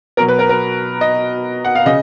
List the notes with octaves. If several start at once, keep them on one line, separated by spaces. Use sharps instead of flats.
B2 F#3 A#4
B4
A#4
A#4
D#5
F#5
F5
C#3 D#5